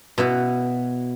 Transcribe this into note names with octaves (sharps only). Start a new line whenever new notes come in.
B2 E4 F#4